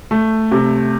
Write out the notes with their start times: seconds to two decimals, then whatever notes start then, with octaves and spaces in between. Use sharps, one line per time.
0.11 A3
0.51 C3